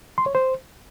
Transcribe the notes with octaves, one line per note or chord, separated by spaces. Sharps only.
C6
C#5
C5